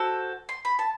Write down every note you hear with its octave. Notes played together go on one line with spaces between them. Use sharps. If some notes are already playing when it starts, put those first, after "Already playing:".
Already playing: C4 F#4 A4 E6
C6
B5
A5